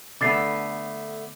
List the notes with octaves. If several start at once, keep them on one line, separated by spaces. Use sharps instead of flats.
D3 A3 B3 D6 A6 C7